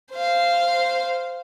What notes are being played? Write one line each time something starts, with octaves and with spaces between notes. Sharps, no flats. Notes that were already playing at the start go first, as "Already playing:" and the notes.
C5 F5